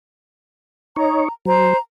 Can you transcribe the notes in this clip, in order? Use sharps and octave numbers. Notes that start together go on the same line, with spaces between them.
D#4 C#5 A#5
F#3 C5 A#5